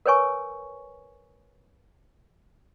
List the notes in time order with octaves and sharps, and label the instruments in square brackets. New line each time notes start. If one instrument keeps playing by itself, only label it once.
[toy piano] A#4 B4 C#5 G#5 C#6